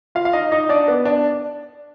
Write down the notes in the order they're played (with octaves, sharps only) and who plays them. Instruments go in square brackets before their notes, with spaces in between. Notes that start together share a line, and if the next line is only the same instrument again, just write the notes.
[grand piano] F4 F5
F5
D#4 D#5
D#4 D#5
D4 D5
B3 B4
D4 D5